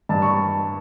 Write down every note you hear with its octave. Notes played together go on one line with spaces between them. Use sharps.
G2 A5
C#6